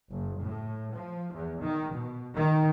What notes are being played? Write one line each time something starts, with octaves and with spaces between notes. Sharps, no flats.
F#1
A2
F3
E2
D#3
B2
D#3